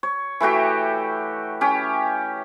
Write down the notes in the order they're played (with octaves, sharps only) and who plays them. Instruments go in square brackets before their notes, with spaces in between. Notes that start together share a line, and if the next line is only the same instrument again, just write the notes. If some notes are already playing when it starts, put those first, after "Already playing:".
[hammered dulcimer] C#5
E3 A3 F#4 G4
C#4 G4